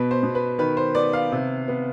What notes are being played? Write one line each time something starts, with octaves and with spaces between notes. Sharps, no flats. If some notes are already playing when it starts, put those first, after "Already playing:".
Already playing: B2 B4
C5
B2
B4
D#3 B4
C5
B3 D5
F5
C3
B3